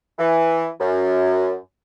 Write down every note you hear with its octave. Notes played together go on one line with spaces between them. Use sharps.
E3
F#2